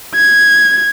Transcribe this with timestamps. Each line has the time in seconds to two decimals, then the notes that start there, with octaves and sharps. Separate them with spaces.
0.15 G#6